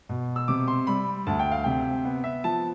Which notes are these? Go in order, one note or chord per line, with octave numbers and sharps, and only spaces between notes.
B2
E6
C3 D6
C6
G3 B5
D2 A5
G5
F5
C3 G5
B3
E5
F3 A5